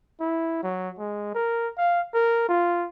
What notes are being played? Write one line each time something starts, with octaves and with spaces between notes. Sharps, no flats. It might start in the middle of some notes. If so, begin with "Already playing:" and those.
E4
F#3
G#3
A#4
F5
A#4
F4